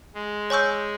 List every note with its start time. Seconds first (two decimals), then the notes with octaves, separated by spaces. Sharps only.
0.15 G#3
0.50 C#5 G#5 C#6 E6 G6